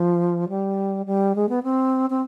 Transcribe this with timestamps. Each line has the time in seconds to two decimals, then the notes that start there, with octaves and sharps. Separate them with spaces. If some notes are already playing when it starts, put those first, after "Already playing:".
Already playing: F3
0.49 G3
1.06 G3
1.35 G#3
1.49 B3
1.63 C4
2.10 C4